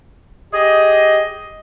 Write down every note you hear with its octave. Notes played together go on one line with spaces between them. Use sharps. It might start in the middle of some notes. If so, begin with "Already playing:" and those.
G4 G#4 D#5